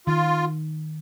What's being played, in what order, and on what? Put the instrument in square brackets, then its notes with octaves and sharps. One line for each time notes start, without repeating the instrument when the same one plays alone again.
[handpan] D#3 [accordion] F4